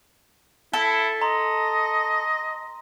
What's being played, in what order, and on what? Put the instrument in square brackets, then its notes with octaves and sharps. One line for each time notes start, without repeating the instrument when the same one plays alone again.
[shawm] E4 [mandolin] A4
[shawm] D#5 [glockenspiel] A#5 C6